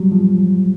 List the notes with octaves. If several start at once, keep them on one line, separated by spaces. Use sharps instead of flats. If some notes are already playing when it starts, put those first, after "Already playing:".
Already playing: F#3 G3
F3